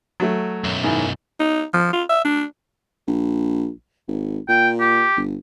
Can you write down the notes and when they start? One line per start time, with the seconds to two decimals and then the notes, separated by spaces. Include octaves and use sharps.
0.20 F#3 A3
0.64 B1 F#2
0.84 G#2 D#3 E4
1.39 D#4
1.74 F3
1.93 F4
2.09 E5
2.25 D4
3.07 A#1
4.08 G#1
4.49 A#2 G5
4.80 G4
5.17 G1